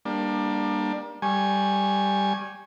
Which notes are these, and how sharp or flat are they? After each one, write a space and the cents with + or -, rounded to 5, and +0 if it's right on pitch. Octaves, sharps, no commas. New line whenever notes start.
G3 +25 A#3 +30 D4 +20
G3 +0 G#5 +0 C#6 -20